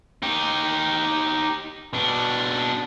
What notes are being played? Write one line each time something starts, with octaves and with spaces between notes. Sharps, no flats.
D#4 G4
B2 D4